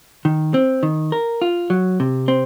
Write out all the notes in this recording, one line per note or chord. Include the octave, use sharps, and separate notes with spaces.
D#3
C4
D#3
A#4
F4
F#3
C3
C4